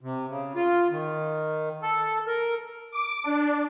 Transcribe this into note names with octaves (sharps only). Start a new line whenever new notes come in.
C3
C#3
F4
D#3
A4
A#4
D6
D4